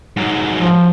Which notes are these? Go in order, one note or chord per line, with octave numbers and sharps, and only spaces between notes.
G#2 F#3
F3